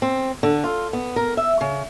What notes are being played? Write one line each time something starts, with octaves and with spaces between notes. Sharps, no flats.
C4
D3
F4
B3
A#4
E5
C#3